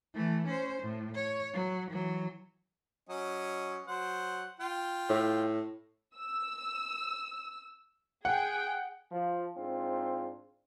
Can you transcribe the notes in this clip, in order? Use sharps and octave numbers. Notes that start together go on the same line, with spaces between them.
E3 A3
C#4 C5
A2
C#5
F#3
E3 F#3
F#3 C#4 D#5
F#3 C5 F#5
F4 G5
A2
E6
G#4 F#5 G5
F3
G#2 C4 D4 F4